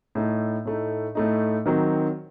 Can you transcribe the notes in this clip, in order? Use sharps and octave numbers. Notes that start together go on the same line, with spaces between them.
A2 A3 D#4
A2 A3 D#4
A2 A3 D#4
D#3 F#3 C4